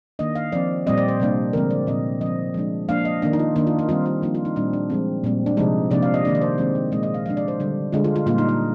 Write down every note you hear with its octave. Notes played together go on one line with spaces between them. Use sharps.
D#3 A#3 D4 D#5
F5
F3 C4 D5
A#2 G3 C4 D#5
D5
C5
C3 G3 A#3 D4
D3 F3 G#3 C4 A#4
D5
A#2 G3 C4 D#5
F3 C4 D#5
F3 G#3 D4
F3 A#3 D4 F5
D#5
D#3 A#3 D4
D#4
F4
D#3 A#3 D4 D#4
F4
D#4
D#3 G3 C4 F4
F4
F3 A#3 D4 F4
F4
D#4
A#2 G3 C4 D4
D4
F3 G#3 C4
A#2 G3 C4
D4
C3 F3 G#3 D#4
C3 F3 A#3 D4 D5
F5
D#5
D#3 A#3 D4 D5
D5
C5
D#3 G#3 C4
D#5
A#2 G#3 C4 D#5
D#5
F5
F3 G#3 D4 F5
D5
C5
D3 G3 D4
D3 G#3 D4 F4
F4
F4
A#2 G3 A#3 D4 F4
D#4
D#4